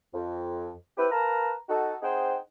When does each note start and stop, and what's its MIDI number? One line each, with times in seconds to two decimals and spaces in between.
0.14 0.71 41
0.98 1.07 60
0.98 1.07 64
0.98 1.07 67
0.98 1.07 71
1.11 1.53 70
1.11 1.53 71
1.11 1.53 77
1.11 1.53 81
1.11 1.53 82
1.69 1.95 63
1.69 1.95 66
1.69 1.95 69
2.02 2.36 60
2.02 2.36 63
2.02 2.36 68
2.02 2.36 72
2.02 2.36 78
2.02 2.36 79